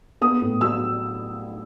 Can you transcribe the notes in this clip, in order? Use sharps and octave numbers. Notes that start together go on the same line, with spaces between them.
B3 D#6
A2
F#3 E6